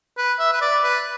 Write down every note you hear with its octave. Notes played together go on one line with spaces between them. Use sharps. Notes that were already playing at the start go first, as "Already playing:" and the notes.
B4
E5
B4
D5
B4